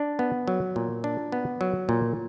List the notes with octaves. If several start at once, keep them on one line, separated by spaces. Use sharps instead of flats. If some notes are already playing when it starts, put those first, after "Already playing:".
Already playing: D4
B3
F#3
A#2
D4
B3
F#3
A#2